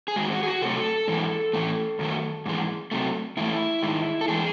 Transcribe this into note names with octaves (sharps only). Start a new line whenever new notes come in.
G#4
G#2 D#3 G#3 F#4
F#4
G#4
F#4
C3 F#3 A3 A4
G#2 E3 G#3
A2 E3 A3
F#2 D#3 F#3 A3
G#2 E3 G#3
C3 F#3 A3
G#2 E3 A3 E4
G#2 D#3 G#3
A4
E3 G#3 G#4